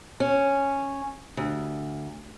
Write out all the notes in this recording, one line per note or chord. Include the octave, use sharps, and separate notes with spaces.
C#4
D2